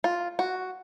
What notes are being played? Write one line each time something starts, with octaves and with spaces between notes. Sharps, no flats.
F4
F#4